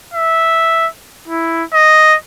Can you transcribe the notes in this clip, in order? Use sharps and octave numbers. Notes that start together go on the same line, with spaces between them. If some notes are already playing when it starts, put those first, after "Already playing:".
E5
E4
D#5